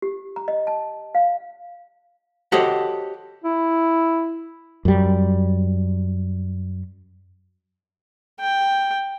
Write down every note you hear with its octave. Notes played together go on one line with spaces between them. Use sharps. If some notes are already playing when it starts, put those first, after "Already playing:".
G4
A#5
D#5
A5
F5
F#4 G4 A4 C5 C#5 D#5
E4
F#2 G3
G5